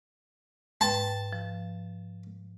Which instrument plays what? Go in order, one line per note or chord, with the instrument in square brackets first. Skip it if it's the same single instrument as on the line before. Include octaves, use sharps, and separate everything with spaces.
[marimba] G#2 B4 G5 [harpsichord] A5
[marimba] F3